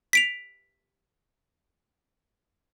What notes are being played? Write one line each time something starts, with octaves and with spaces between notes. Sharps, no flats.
B6 D7 F7